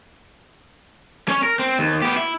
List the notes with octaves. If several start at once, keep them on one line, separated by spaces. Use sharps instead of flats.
C#4 C#5
A#4
C4
D#2
B3 G4
E4